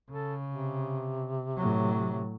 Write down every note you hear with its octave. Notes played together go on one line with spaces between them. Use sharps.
C#3 A4
C3
A2 F#3